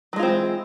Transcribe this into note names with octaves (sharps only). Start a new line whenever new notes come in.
E3 F#3 G#3 C4 F4